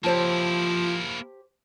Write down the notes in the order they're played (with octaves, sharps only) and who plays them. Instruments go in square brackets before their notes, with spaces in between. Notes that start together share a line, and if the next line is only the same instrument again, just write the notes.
[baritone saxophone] F3 [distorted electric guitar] A#3 E4 [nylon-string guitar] G4 C5 A5